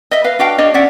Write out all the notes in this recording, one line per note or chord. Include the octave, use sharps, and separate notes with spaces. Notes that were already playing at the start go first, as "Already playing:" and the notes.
D#5 E5
B4 F5
D4 F#4 F5 G5
D4 G#4 C#5 D#5
C#4 D5 E5 F#5